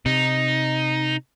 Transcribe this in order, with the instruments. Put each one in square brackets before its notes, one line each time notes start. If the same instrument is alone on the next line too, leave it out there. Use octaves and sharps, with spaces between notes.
[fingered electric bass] C3 [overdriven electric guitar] D#4